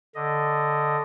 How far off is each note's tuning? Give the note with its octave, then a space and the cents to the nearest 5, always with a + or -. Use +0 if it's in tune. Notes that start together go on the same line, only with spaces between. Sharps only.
D3 +0 D#5 +0